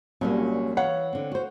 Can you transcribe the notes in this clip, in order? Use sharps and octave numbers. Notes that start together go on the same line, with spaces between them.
C2 A#2 F#3 G3 A#3 C#4
E3 C#5 F5 F#5
D3 C4
F#4 C5